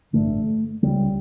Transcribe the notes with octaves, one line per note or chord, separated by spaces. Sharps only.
A1 G2 D3 A3
C#2 C#3 G3